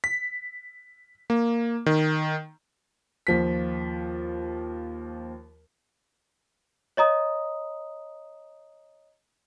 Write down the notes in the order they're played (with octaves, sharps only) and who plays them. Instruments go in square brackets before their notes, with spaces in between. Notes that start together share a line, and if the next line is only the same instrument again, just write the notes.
[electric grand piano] B6
A#3
D#3
[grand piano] D#2 F3 B6
[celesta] C#5 D#5 A#5 D#6